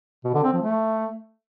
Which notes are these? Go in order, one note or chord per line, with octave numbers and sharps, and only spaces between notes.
B2
D3
C4
F3
A3